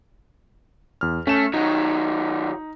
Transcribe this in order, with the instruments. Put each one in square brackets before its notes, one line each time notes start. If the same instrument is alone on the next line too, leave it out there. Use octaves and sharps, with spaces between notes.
[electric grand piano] E2 F6
[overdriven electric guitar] A3 [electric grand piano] C#4 E7
[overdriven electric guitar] D#3 F#3 [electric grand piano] D#4